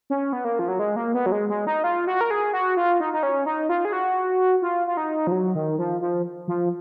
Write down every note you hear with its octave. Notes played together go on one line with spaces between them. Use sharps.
C#4
B3
A#3
F3
F#3
G#3
A#3
B3
F#3
G#3
G#3
D#4
F4
F#4
A#4
G#4
F#4
F4
D#4
D#4
C#4
D#4
F4
G#4
F#4
F4
F4
D#4
F3
F#3
D#3
F3
F3
F3